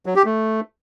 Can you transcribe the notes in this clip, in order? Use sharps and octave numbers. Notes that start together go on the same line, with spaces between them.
F#3
G4
A3